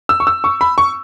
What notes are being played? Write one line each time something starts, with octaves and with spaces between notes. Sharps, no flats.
E6
C#6
E6
C#6
B5
C#6